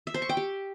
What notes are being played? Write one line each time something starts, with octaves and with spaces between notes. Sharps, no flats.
E5
C5
C#6
G5
G4